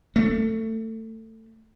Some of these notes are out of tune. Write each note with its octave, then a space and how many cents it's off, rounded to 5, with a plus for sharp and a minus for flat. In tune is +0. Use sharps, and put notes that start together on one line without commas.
A3 +20